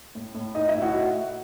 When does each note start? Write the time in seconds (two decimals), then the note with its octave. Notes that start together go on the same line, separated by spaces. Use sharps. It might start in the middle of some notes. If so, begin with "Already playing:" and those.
0.15 A2
0.35 A2
0.55 A2 D#4 D#5
0.69 E4 E5
0.76 A2
0.82 F#4 F#5